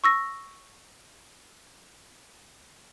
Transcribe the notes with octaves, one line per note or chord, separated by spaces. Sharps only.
C#6 E6 A#6